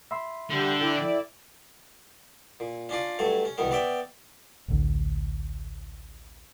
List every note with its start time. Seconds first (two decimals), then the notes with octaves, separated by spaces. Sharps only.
0.11 E5 B5 C6
0.50 D3 G3 G4
0.80 E4 A4 D5 G5
2.60 A#2
2.89 C#4 D4 F4 D5
3.19 G2 F#3 A3 C#5
3.45 C#4
3.58 C2 F#2 D#3 B3 C#4
3.71 B3 C#5 D5 E5 G5
4.68 A1 D2 D3